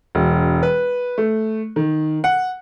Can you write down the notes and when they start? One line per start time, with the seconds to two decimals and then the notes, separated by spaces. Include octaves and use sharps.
0.15 E1
0.63 B4
1.18 A3
1.76 D#3
2.24 F#5